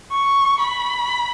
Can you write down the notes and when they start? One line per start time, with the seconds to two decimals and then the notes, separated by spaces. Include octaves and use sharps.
0.12 C#6
0.60 B5